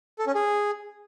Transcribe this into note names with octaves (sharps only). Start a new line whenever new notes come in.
A4
C#4
G#4